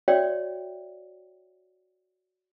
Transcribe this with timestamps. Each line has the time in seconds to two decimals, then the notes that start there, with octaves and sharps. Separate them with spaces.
0.08 F#4 C#5 D5 E5 G5